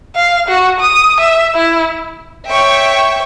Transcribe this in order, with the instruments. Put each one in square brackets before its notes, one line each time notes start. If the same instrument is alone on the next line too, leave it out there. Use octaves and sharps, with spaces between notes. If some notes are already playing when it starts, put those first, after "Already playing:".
[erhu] F5
F#4
D#6
E5
E4
[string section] C#5 E5 G5 C#6